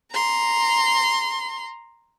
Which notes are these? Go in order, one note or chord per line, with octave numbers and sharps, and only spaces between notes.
A#5 C6